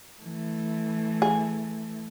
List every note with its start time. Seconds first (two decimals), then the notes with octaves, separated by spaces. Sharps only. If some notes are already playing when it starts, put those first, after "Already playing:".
0.23 E3 A3
1.22 G#4